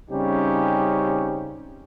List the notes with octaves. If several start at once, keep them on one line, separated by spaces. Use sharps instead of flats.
C#3 G3 C4 C#4 D#4 G4